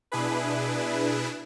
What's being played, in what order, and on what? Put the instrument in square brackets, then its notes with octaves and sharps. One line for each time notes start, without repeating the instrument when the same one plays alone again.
[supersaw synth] B2 D4 E4 G#4 B4